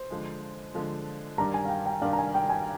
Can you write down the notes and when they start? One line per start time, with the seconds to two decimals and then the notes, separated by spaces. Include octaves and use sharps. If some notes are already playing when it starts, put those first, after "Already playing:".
Already playing: C5
0.10 D3 F3 G#3
0.74 D3 F3 G#3
1.38 G2 D#3 G3 D4 A#5
1.54 G#5
1.65 F5
1.69 G5
1.86 G5
2.01 G2 D#3 G3 D4 F5
2.13 A#5
2.18 G#5
2.34 G5
2.50 G#5